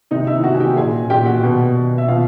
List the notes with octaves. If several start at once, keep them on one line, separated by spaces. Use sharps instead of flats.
C3 D#4 D#5
D#3 E4 E5
C3 F#4 F#5
G#5
D#3 G4 G5
A#2 G#4 G#5
A#2 G4 G5
F#4 F#5
B2
B2
E5
B2 F4 F5